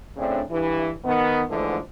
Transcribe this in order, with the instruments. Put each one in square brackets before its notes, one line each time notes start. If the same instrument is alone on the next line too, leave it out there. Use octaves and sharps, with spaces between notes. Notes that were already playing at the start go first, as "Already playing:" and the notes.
[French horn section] A2 C#3 C4 D4
G2 E3
D#3 B3
G#2 D3 E3 F3 A3